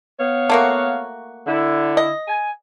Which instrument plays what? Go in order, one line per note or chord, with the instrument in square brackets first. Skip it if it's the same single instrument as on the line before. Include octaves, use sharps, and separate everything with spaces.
[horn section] B3 C#5 F5
[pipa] A3 A#3 F#4
[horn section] D3 E4
[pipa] D#5
[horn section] G#5